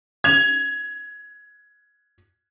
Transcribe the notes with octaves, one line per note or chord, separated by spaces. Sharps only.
G#6 F7